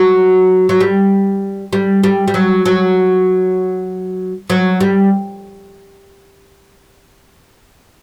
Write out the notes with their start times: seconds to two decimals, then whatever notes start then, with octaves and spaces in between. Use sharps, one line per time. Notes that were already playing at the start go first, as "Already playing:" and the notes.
Already playing: F#3
0.69 F#3
0.81 G3
1.73 G3
2.03 G3
2.28 G3
2.34 F#3
2.66 F#3
4.50 F#3
4.80 G3